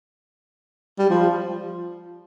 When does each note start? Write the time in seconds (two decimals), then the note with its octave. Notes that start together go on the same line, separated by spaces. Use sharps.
0.99 G3
1.10 F3